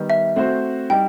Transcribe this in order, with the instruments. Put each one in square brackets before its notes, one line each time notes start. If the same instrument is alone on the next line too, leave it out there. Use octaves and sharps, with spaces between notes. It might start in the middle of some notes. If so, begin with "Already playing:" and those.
Already playing: [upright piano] D#3 G3 B3
[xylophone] E5
[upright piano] A3 C4 F#4 C5
[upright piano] G3 D#4 [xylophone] G5